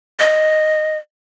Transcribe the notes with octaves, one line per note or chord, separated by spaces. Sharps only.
D#5